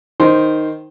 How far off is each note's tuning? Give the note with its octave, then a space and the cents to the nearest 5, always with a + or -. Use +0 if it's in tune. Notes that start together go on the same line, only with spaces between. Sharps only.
D#3 +0 C5 +0